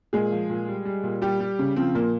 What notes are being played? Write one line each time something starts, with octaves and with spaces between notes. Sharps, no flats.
A#2 G#3 G#4
F3
A#2
G3
G3
A#2
G3 G4
G3
C#3
F3 C4
A#2 A#3